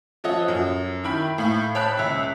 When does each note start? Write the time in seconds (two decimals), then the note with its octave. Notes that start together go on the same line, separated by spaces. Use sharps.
0.24 F3 A4 C#5 D#5 F#5
0.48 F#2
1.04 D#3 E4 G5 B5
1.38 A2 F5 B5
1.75 C#5 G5 A5 B5 F#6
1.97 C#2 E5 B6